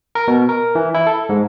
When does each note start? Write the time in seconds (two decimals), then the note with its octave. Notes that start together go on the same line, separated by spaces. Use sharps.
0.15 A#4
0.28 B2
0.49 A#4
0.75 E3
0.94 E4
1.07 A4
1.29 G#2